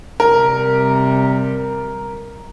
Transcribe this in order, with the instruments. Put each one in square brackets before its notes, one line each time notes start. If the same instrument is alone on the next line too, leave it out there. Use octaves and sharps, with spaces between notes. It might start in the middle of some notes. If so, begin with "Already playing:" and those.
[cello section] C3 G3 [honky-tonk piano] A#4